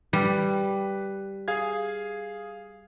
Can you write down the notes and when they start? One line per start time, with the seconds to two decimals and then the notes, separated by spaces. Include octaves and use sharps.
0.13 G3 B4
1.48 G#4 F5 G#6